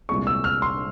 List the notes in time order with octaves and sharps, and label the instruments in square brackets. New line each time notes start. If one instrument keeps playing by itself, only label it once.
[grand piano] C2 A#2 G#3 C#6
E6
F6
C6